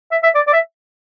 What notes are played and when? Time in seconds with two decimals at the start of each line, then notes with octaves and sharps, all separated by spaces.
0.11 E5
0.23 E5
0.35 D5
0.47 D5
0.53 E5